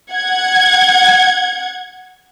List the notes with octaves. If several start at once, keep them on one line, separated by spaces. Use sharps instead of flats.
F#5 G#6